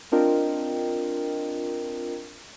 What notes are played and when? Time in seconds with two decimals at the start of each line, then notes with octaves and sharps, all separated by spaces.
0.12 C4 D4 F4 A#4 D#5 G5